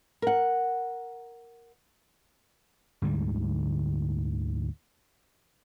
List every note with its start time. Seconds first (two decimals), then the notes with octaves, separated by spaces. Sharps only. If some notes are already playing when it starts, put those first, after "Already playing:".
0.22 A#4 F#5
3.02 D2 G#2 D3 G3